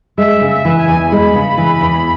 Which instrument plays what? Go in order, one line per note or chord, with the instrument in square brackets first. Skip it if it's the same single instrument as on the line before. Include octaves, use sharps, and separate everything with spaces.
[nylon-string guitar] G#3 [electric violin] E5
[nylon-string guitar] C#3
[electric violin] E5
[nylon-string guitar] E3
[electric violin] G#5
[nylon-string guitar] E2
[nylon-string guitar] G#3 [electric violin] B5
[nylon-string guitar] C#3
E3
E2